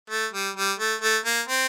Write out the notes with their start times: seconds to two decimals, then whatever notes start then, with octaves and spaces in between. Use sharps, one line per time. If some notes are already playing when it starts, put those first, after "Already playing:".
0.10 A3
0.34 G3
0.56 G3
0.79 A3
1.02 A3
1.25 A#3
1.48 C4